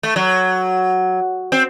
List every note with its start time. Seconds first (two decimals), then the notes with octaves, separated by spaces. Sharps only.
0.03 A3
0.16 F#3
1.52 C4